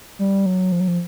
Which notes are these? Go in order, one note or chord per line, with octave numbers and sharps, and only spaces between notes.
G3
F#3
F3
F#3
F3